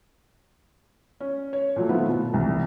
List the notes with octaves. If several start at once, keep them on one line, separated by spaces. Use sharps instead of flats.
C#4
C#5
A#2 F#3 A3
D#3 A3 B3 C4 E4 F4
B2 F#4
E1 C2